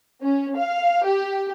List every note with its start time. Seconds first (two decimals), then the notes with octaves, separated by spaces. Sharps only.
0.22 C#4
0.57 F5
1.06 G4